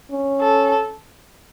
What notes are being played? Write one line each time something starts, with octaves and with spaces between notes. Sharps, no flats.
C#4
A4